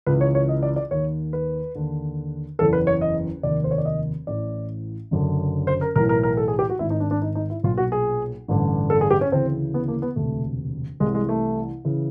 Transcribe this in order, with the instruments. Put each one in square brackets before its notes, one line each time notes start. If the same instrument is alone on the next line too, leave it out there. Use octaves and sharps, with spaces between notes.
[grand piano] C#2 C#3 E3 B4
C#5
C#5
D#5
D5
D5
D#2 D#3 C#5
B4
D#2 D3
F#1 E2 C#3 E3 A4
B4
C#5
D#5
F1 D#2 D#3 D5
C5
C#5
D5
D#5
A1 A2 E3 D5
F#1 F#2 D3
C5
A#4
B1 A2 E3 A#4
A#4
A#4
A4
G#4
G4
F#4
G#1 G#2 D#3 E4
D#4
D4
D4
D#4
D#4
E4
B1 A#2 F4
F#4
G#4
A1 G2 D3
A4
G#4
G4
C#4
D2 C#3 E3 C4
B3
A#3
B3
E1 D2 C3 A3
C2 C3 E3 G#3
G#3
A3
C#3 E3